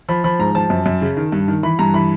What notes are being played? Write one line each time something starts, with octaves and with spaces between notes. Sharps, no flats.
F3 B5
F3 B5
G#2 A#5
F3 A5
F#2
F#2
C#3
D#3
G2
D#3
E3 B5
G2 A#5
E3 B5